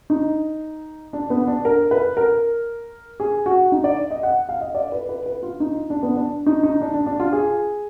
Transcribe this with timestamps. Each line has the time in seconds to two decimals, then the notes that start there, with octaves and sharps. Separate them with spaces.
0.10 D#4
1.13 D4
1.30 B3
1.47 D4
1.65 A#4
1.91 B4
2.17 A#4
3.20 G#4
3.46 F#4
3.72 D#4
3.84 D5
4.11 D#5
4.23 F#5
4.49 F5
4.61 D#5
4.75 D5
4.92 B4
5.09 B4
5.26 B4
5.43 F4
5.60 D#4
5.90 D4
6.03 B3
6.16 D4
6.46 D#4
6.63 D#4
6.81 D4
6.94 D4
7.06 D4
7.20 F4
7.33 G#4